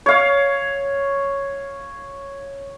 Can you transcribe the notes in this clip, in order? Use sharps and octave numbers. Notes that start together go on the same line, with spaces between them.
C#5 F5